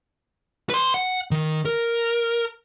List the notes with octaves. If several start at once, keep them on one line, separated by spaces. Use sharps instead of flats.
B4 C6
F#5
D#3
A#4